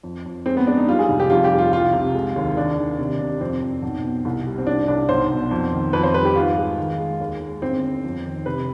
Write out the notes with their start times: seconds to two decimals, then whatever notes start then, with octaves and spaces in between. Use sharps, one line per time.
0.03 F2
0.26 F2
0.46 G#3 C4
0.57 B3
0.67 G#3 D4
0.77 D#4
0.88 G3 F4
0.99 G#4
1.09 F1
1.20 G4
1.30 F2 F4
1.44 G4
1.51 G3
1.59 F4
1.72 C2 F4
1.93 C3
2.15 G#3
2.36 D#2
2.57 D#3 D4
2.78 D#3
2.99 C3
3.20 C3
3.40 F2 C4
3.61 F2
3.82 B1
4.04 B2
4.25 C2
4.47 G3
4.58 C4
4.67 C2 D4
4.88 C2 D4
5.09 B1 C5
5.30 B2
5.51 F2
5.72 D#3
5.93 F2 B4
6.03 C5
6.14 G3 B4
6.25 G4
6.35 G#1 F4
6.57 G#3
6.78 D#3
6.99 G#3
7.20 D#2
7.41 G#3
7.62 G1 C4
7.83 G1
8.04 F2
8.25 D#3
8.46 C3 B4